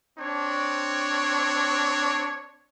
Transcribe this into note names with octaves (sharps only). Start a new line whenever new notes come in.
C4 D4 C#5